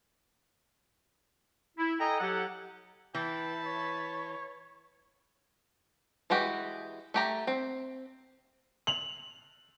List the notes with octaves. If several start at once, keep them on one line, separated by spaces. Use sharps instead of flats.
E4
A4 D#5 G5 G#5 A#5
F#3 G4 A4 F#5
E3 G5 A5 B5
C#5
E3 G#3 F#4 G4
A3 G4 A#5
C4
F7 F#7